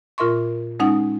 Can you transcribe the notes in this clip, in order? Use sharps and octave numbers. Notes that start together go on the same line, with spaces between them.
A#2 F4 A#4 E5 C6 C#6
G#3 C#4 D#4 F#5 D#6